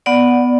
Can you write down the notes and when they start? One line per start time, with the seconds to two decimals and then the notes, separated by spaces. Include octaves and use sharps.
0.06 B3 D5 F#5